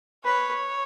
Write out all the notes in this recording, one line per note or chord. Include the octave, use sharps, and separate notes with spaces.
B4 C#5